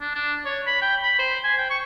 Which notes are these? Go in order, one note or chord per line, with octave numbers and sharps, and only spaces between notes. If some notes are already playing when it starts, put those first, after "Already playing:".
D4
D4
C#5
B5
G5
B5
C5
G#5
G5
C#6